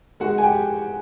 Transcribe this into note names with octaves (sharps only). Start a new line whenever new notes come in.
G#3 F#4 F#5
G#5
G4 G5